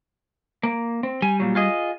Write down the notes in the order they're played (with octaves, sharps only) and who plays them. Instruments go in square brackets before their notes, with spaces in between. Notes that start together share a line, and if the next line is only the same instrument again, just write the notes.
[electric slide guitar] A#3
C4
[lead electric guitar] G3 [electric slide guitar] G#5
[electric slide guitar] A#2 F#3
F4 G#4 D#5